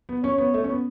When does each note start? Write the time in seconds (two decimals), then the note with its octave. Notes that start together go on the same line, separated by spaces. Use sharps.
0.09 B3
0.24 C#4 C#5
0.38 B3
0.54 A3
0.64 C#4
0.70 B3